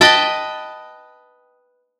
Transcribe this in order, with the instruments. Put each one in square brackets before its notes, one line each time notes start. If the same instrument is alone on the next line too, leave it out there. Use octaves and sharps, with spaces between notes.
[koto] B4 D#5 G5 A5